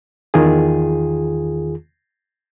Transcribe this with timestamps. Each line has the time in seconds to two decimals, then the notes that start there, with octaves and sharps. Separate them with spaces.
0.34 E2 D#3 F4 G#4